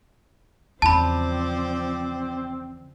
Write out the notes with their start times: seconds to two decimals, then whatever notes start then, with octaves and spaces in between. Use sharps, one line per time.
0.82 E2 C#3 F3 C4 C5 D5 A5 B5